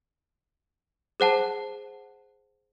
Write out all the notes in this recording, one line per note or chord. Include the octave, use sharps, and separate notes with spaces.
G#4 C5 F#5 A5